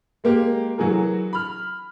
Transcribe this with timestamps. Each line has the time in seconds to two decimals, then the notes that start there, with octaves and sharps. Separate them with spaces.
0.24 G#3 A#3 G4
0.78 E3 F#3 F#4 G#4 A#4
1.33 B5 F6